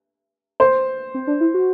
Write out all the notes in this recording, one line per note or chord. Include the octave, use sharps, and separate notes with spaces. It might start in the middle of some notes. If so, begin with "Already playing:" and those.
C5
C4
D4
E4
F#4